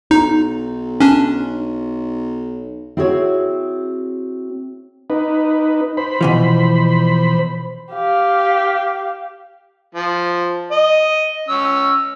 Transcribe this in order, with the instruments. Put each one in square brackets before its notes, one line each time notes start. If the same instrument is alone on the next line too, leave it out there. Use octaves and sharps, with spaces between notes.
[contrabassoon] B1 [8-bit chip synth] D#4
[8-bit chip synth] C#4 D4
[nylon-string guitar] C4 E4 F#4 G#4 A#4 C#5
[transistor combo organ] D#4 B4
C5 B5
[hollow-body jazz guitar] B2 E3 F3
[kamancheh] G4 F5
[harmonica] F3
D#5
C#4 E6